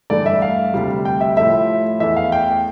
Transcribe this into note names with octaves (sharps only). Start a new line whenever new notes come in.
G2 E3 A3 D5
E5
F5
D2 C3 G3
G5
E5
A2 F3 A3 E5
E2 E3 A3 E5
F5
G5